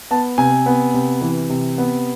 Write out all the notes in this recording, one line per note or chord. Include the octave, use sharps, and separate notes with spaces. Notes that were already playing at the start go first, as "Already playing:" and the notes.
B3 A5
C3 G#5
B3
C3
E3
C3
B3